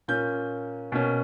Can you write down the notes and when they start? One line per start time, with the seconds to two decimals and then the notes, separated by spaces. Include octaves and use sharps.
0.08 A#2 A#3 C#4 G6
0.92 B2 A#3 C#4